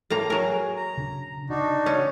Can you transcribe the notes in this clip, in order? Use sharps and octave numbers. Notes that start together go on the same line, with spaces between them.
A2 A#3 A#5
F#3 G#4 A#4
A#5
C#3 D4
C#3 D4 D#4 F#4
C#4